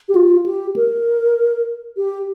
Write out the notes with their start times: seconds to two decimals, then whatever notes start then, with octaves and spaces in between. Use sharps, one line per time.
0.09 G4
0.15 F4
0.46 G4
0.76 A#4
1.97 G4